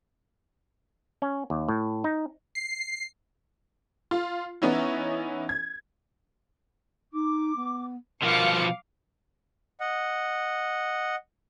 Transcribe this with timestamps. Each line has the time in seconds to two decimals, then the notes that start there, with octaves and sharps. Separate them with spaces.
1.22 C#4
1.50 D#2
1.69 A2
2.04 D#4
2.55 C7
4.11 F4
4.62 E3 B3 C#4 D#4 E4
5.49 G#6
7.13 D#4 D6
7.56 B3
8.23 B2 F3 F4 A#4 F5 D6 F6 C#7
9.80 D#5 F#5